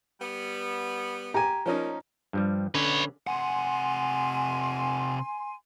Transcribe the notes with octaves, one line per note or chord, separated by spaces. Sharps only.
G3 B3
G4 G#5 A#5
A#2 F3 C#4 D#4
G2 F3 G3
D3 C#4 B4 C#5
C3 F#5 G#5 C6